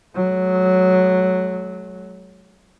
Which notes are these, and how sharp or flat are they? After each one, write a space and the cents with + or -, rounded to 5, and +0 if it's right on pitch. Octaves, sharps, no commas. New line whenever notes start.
F#3 +0 A3 -45